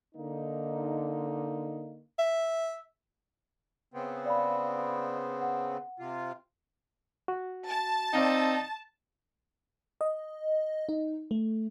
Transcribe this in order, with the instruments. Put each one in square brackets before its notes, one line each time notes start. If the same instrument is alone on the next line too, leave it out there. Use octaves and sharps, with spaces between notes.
[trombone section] D3 A#3 D#4
[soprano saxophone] E5
[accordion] C#3 B3 C4
[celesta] D5 F5 B5
F#5
[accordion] C3 F4
[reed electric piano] F#4
[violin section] A5
[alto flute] C4 [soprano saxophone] D#4 [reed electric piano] D5 F5 G5
[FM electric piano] D#5
D#4
A3